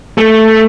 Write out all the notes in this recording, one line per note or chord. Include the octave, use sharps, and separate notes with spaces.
A3